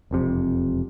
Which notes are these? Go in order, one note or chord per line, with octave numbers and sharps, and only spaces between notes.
E1 F2 C3